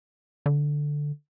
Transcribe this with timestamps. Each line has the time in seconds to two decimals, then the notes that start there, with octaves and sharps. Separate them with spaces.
0.46 D3